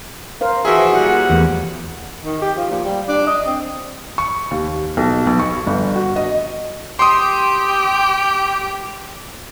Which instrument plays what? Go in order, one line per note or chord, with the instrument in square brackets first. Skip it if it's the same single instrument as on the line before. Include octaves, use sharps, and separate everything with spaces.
[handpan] A#4 C5 F5
[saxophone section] E3 F3 E5 [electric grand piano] F#4 G#4
[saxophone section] A#2 G3 F#5 [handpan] E4
[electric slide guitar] E2 [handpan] A3 G#4
[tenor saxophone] D#3
G4
F3
A#2
G3
D4
D#5
C4
[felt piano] C#6
D#2
B1
B1
C#6
G1
F#4
D#5
[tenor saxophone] G4 [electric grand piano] C6 D#6